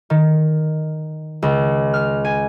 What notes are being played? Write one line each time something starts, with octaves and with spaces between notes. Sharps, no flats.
D#3
C#2
F6
G#5